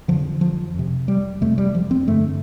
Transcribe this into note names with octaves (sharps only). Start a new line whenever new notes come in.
F2 D3 F3
F3
F2 C3
G3
F2 C3 A3
G3
F3
C4
G2 D3 A3